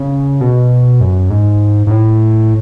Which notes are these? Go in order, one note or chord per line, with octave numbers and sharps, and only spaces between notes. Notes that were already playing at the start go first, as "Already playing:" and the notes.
Already playing: C#3
B2
F#2
G#2
G#2
A2